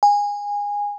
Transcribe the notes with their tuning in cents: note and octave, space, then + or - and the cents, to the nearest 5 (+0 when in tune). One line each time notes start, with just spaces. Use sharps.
G#5 -20